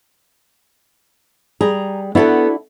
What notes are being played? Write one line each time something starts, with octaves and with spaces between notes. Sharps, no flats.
G3 G#4 A#5
B3 D4 E4 F#4 A4 B4